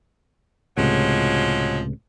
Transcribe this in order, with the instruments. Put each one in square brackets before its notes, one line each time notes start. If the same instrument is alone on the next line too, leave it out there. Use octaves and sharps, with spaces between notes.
[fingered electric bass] C#2 A2 C3 [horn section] F3 F#3 G#3